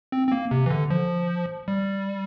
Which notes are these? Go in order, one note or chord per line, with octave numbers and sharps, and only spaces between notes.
C4
C4
A#3
C3
E3
D3
F3
G3